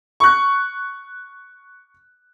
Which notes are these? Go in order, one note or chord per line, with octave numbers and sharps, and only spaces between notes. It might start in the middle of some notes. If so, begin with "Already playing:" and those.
C#6 F#6